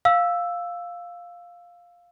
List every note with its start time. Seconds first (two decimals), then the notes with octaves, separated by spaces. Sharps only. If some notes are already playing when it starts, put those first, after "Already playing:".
0.05 F5 E6